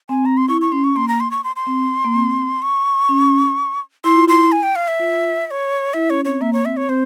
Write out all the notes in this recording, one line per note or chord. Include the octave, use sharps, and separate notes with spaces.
C4 G#5
C4 A#5
C6
E4 C#6
C#6
C#4 C6
C#6
A#3 C6
A#5
C6
C#6
C6
C6
C4
A#3
C4
C#6
C#4
E4 C6
F4
E4 C6
G#5
G5
F5
E5
F4
E5
C#5
E4 E5
C#4 C#5
C4 C#5
A#3 E5
C#5
C4 E5
C#5
C4 C5